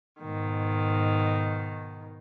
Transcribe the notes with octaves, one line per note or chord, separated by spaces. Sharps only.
G#2 B2 D#3